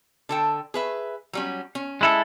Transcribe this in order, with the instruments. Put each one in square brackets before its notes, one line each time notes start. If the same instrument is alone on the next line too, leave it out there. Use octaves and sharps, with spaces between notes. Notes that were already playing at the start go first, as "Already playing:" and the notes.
[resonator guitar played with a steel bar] D3 A4 G5
G#4 B4 E5
F#3 G3 C#4
C#4
[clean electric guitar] G#3 E4 A4